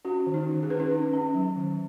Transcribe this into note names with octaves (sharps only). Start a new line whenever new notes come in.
C#4 F#4
D#3
D#4
D#3
G#4
C#4 B4
D#4 G#4
C#4
C#4
F#3
D#3